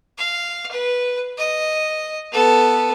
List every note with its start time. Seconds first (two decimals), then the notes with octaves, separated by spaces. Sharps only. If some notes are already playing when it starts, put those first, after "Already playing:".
0.18 F5
0.71 B4
1.38 D#5
2.32 B3 A4